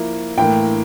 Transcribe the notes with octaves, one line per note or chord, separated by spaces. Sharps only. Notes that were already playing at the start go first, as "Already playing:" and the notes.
Already playing: F3 A#3 E4
A2 E3 A#3 G5